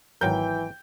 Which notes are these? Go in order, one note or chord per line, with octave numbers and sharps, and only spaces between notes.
G#1 E3 F#3 A#4 G5 G6